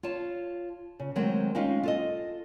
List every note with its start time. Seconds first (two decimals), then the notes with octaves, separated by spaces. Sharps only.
0.03 F4 C#5 A5
1.00 C#3
1.16 D#3 F#3 G#3 A3 C4
1.55 G#3 C4 C#4 D#4 F4 F5
1.83 F4 A4 D#5